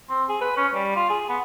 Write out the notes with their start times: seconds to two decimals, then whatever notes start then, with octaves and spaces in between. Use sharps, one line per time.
0.10 C4
0.29 G#4
0.41 B4
0.57 C#4
0.74 G3
0.96 F4
1.10 G#4
1.29 B3